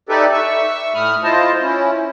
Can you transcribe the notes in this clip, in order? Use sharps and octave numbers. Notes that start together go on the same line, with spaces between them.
D#4 G4 A4 B4 D5 E5
E5 C#6 E6
A2 A3 B5 D#6 F6
E4 F4 C5 D#5 A5
C#4 E4